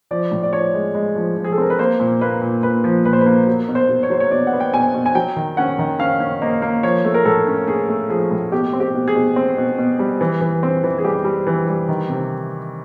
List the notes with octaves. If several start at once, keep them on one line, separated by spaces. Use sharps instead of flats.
F3 D5
A2
D5
F3 C#5
G#3
G#3
F3
F3
G#4
A4
C4 A#4
B4
A#3 C5
A#2
A#3 B4
A#2
A#2 B4
F3
A#2 B4
C5
B4
A#3
F#3
B2
C5
B2
C#5
F#3 C5
C#5
B2 D5
F#5
B3
G5
B2 G#5
B2
G#5
F#3 G5
D#3
C#4 F#5
D#3
C#4 F5
C#4
A#3 D#5
A#3
F3 C#5
A3
A#4
A2 A4
C#4
C#4 G#4
A3
F3 G#4
A2
B2 G4
C4
G4
B2
G#4
B2
C4
B2
B2
G3
E3
E3
C4
E3
G#4
G3 G4
G3
E3
G3
D#3
C3